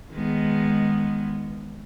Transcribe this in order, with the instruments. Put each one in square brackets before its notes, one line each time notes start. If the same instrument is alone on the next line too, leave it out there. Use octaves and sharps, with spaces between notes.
[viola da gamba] D#3 G#3 B3